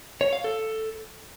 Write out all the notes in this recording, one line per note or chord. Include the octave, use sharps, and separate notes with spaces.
C#5
F5
A4